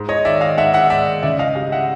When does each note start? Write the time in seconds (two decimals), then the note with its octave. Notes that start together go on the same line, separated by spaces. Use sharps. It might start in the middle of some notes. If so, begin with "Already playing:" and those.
Already playing: G#2
0.09 C#5 D#5
0.25 D#3 D5 E5
0.41 D#5 F5
0.58 G#2 E5 F#5
0.74 E5 F#5
0.90 G#2 D5 E5
1.23 C#3 D5 E5
1.39 D#5 F5
1.55 G3 D#5 F5
1.72 E5 F#5